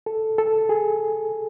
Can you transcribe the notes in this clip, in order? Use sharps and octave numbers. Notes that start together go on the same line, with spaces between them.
A4
A4
G#4